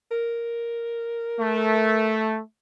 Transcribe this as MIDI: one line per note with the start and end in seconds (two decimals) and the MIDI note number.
0.11 2.16 70
1.39 2.39 57